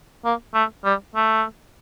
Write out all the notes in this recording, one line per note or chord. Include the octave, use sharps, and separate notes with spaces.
A#3
A3
G3
A3